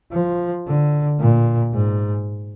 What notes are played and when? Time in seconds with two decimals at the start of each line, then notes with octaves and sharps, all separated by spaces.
0.12 F3
0.67 D3
1.20 A#2
1.73 G#2